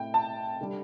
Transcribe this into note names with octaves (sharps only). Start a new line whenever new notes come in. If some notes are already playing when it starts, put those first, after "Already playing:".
Already playing: A2 A3 C4 E4 G5
A5
D3 G3